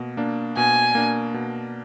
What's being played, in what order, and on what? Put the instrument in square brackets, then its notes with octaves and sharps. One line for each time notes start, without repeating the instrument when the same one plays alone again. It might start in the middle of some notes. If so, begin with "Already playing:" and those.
Already playing: [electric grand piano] B2 A#3
A#3 D4
[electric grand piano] B2 [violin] G#5
[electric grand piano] A#3 D4
B2